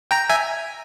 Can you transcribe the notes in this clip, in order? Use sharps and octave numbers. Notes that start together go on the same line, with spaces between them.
G5 A#5
E5 G#5